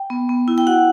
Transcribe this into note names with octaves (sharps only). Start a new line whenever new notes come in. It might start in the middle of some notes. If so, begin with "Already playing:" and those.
Already playing: G5
B3
B3
E4
G5
F#4 F#5